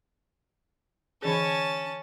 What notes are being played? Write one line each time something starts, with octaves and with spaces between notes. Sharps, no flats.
D3 E3 C#4 G#4 A5